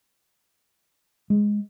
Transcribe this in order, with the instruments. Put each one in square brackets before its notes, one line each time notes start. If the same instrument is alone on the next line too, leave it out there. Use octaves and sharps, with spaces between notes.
[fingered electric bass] G#3